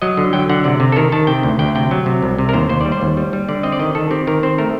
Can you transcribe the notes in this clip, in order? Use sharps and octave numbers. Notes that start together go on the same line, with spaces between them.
F#3 D#5
D3
F#3 G5
D3 F#5
C3 D5
C3
A4
D#3 A#4
D#3 A5
C3 G5
D2
D2 G5
C3 G5
F#3
C3
C2
C3
A#4
D#2 C5
D#2 C5
G3 D5
C5
D#2
G3
G3
D3 D5
C4 D#5
D5
D#3 D#5
D#3 A4
C4 G4
D#3 A#4
C4 C5
A3 A#4